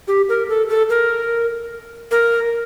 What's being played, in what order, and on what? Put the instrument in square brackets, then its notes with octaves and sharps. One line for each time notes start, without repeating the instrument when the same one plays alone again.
[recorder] G4
A#4
A4
A4
A#4
A#4